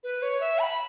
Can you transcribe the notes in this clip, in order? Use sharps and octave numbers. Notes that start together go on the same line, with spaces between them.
B4
C#5
E5
B5